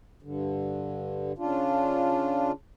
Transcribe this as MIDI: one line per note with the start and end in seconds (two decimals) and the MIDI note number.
0.22 1.32 43
0.22 1.32 50
1.38 2.52 49
1.38 2.52 62
1.38 2.52 65